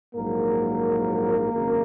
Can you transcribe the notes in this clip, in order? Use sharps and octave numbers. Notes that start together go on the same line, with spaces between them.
A#1 G#2 F#3 A#3 A#4
G#1 F#2 C#3